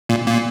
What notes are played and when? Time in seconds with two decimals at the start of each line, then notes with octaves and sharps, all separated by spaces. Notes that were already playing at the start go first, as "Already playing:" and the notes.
0.09 A#2
0.27 A#2